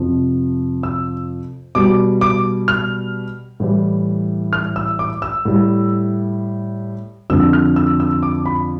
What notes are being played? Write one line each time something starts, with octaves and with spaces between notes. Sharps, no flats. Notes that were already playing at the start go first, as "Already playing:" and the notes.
Already playing: F2 C3 F3
E6
B2 G3 D6
D6
F6
A2 E3 G3
F6
E6
D6
E6
A2 G3
F2 D3 F3 E6
F6
E6
E6
D6
B5